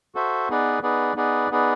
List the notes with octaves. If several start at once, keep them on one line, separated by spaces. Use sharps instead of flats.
F#4 A4 C5 E5
B3 D#4 G#4 B4 D5
B3 D#4 G#4 B4 D5
B3 D#4 G#4 B4 D5
B3 D#4 G#4 B4 D5